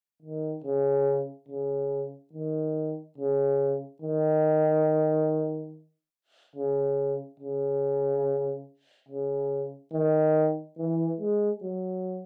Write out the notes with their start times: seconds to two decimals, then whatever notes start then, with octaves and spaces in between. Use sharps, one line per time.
0.22 D#3
0.64 C#3
1.48 C#3
2.33 D#3
3.18 C#3
4.02 D#3
6.56 C#3
7.40 C#3
9.08 C#3
9.93 D#3
10.78 E3
11.20 G#3
11.62 F#3